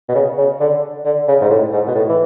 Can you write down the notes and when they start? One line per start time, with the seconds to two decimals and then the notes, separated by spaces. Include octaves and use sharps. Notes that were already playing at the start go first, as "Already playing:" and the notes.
0.09 B2
0.15 C#3
0.38 C#3
0.60 D3
1.05 D3
1.28 C#3
1.41 G#2
1.50 A2
1.73 G#2
1.87 B2
1.95 A2
2.09 E3